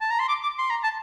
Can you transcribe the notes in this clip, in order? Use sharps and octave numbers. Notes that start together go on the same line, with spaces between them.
A5
A#5
C6
D6
D6
C6
A#5
A5